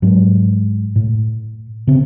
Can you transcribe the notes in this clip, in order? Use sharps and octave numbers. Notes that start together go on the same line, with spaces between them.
G#2 F#3 G#3
A2
C#3 C4